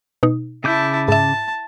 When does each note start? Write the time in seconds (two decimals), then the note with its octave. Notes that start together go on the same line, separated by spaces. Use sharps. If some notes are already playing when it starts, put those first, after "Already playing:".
0.23 B2 D#4
0.64 C#3 E4 A5 D6 G6
1.08 G#2 E5 A5